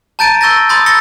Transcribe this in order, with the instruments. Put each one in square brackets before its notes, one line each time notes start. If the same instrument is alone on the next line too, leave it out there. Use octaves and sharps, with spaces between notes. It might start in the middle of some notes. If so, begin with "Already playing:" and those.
[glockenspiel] A5 A#5 G6 A6 D7 D#7
C#6 E6 G6 A6 A#6
B5 C6 D#6 G6 A6
E6 A6 A#6 C#7 G7